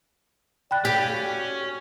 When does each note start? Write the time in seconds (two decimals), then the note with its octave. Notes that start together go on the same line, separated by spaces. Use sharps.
0.71 D5 G5 B5 F#6
0.85 C#4 G4
1.12 F#4